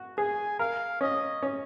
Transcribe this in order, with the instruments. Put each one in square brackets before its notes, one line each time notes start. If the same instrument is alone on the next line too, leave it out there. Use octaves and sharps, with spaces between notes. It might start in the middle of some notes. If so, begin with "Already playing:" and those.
Already playing: [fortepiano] F#4
[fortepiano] G#4 [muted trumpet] G#5
[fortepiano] A#4 [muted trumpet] F5
[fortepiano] C#4 [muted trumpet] D#5
[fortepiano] C#4